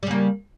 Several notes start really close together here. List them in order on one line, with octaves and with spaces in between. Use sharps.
G3 C#3 A#3